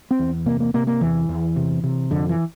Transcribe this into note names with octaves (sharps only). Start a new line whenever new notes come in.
C4
E2
C3 A#3
A#3
C3 A#3
A#3
E2 E3
E2
C3
C3
F2 D3
E3